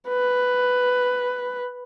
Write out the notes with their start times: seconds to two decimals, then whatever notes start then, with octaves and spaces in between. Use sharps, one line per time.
0.09 B4